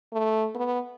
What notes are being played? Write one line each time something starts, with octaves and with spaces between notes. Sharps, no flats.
A3
B3